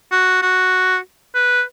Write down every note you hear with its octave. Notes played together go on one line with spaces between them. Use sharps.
F#4
F#4
B4